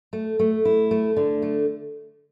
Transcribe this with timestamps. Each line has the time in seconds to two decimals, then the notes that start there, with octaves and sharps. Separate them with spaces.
0.13 A3
0.39 A3
0.65 E4
0.91 A3
1.17 D3
1.42 A3